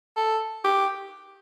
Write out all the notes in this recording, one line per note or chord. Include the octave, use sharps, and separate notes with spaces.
A4
G4